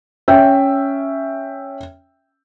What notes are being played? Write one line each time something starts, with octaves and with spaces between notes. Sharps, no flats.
C#4 E5 G5